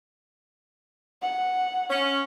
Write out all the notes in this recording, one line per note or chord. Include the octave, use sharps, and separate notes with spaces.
F#5
C#4